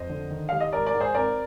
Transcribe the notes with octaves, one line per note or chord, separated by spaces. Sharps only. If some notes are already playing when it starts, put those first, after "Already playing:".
Already playing: F2 C5 D#5
D3
D#3
G3 F5
D#5
G#1 A#4 D5
A#4 D5
G#2
G#4 C5
C4 A#4 D5